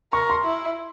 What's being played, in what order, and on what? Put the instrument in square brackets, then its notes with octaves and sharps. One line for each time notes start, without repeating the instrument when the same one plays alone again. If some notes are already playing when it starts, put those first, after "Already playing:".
[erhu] A#4 [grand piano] C#6
[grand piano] C6
[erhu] E4